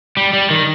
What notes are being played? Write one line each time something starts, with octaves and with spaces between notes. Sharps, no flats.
G3
G3
D#3